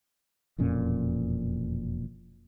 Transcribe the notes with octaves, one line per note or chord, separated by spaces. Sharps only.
E1 F2 A#2 C#4